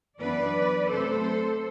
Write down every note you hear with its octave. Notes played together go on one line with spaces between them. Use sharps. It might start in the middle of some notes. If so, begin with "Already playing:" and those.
F#2 E3 B3 D4 B4 D5
C3 F#3 A3 C4 A4 C5